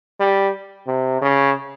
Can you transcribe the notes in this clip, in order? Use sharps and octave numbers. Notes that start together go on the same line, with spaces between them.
G3
C3
C#3